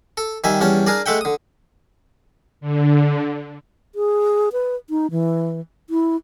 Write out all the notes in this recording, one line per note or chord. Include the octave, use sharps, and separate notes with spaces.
A4
D#3 G3 E5 G#5
E2 G3 C#4 A5
D4 G#4 A#4 D5
G#3 A3 E5 F#5 G5
D3 D#6
D3
G#4
B4
D#4
E3
E4